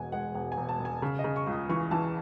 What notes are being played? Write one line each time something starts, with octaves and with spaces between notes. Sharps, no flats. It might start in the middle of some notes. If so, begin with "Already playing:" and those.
Already playing: E1 B2 F#5 G#5
G#3 F#5
E1 F#5
G#5
E1
A5
E1
G#5
C#3
D#5
C#3
C#6
C#2
D#6
E3 C#6
E3 A5